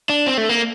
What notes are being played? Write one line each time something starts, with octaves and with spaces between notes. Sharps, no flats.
D4
C4
A3
A#3